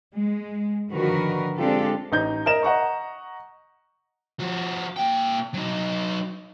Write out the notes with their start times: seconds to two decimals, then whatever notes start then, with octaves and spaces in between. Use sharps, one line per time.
0.13 G#3
0.90 D3 D#3 F3 F#4 A#4 B4
1.57 G#3 C4 D4 F4 G4 A4
2.12 A1 D#4 G6
2.46 A#4 D#5 E7
2.63 D#5 F#5 A#5 C#6
4.40 F3 F#4
4.96 A#2 G5
5.54 F#3 D#4